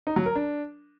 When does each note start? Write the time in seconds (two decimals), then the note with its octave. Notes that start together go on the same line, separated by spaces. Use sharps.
0.07 D#4
0.16 F#3
0.26 A#4
0.35 D4